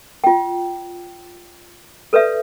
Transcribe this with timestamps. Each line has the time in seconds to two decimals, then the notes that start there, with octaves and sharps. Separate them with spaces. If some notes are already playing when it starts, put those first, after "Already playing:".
0.24 F4 G5
2.13 A4 B4 D5 E5